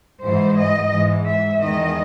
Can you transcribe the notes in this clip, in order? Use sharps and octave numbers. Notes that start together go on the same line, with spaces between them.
G#2 E3 G#3 C5
D#5
G#2 E3 G#3
E5
E2 D#3 G#3 D#5